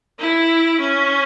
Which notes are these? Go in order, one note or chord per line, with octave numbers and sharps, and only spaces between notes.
E4
C#4